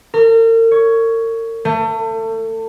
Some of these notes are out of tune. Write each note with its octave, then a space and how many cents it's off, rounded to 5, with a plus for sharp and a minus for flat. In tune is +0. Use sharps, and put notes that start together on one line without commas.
A#4 -40
C#5 +10
A3 +30